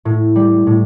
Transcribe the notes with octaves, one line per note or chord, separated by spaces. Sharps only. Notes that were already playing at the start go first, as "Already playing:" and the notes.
A2
G3
A2